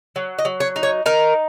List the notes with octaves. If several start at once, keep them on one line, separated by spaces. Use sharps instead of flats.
F#3
D#5
F#3
C#5
D#4
C#5
D#4 A#4